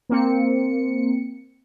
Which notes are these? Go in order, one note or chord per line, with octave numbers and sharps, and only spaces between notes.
A#3 C4 C#7